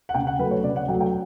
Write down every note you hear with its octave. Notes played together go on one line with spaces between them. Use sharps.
F#5
C#3 G5
F#5
F#3 A3 B4
C#5
C#3 D5
F#5
F#3 A3 G5
G5